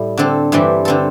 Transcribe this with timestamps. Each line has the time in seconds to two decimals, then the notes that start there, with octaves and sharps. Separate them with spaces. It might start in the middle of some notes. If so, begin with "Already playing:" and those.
Already playing: A2 G3 E4
0.18 D3 C4 A4
0.52 G2 E3 G3 C4
0.85 D3 C4 A4